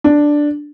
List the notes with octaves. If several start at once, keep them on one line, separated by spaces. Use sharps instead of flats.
D4